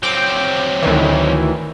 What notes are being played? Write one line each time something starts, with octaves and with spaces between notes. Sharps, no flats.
F#3 C4 G5 D6
D2 D#3 E3